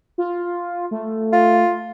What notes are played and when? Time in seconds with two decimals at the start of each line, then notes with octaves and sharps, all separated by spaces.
0.18 F4
0.91 A3
1.33 F4